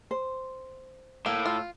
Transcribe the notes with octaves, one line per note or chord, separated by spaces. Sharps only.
C5
A2 A#3 E6
F4